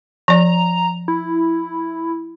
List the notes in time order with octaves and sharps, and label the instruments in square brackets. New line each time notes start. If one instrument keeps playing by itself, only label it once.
[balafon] F3 D5 [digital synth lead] A#5
[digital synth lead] E4